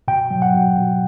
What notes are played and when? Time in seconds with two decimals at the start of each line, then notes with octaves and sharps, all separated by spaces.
0.08 B2 G5
0.31 F#3
0.42 F#5
0.54 B2
0.78 B2